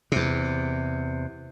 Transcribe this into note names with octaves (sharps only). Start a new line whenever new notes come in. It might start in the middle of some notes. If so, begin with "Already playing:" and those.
E2 C3